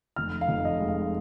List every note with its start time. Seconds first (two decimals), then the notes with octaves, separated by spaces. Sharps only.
0.16 F1 F6
0.41 F5
0.48 F1
0.65 D#5
0.80 G#3
0.88 F5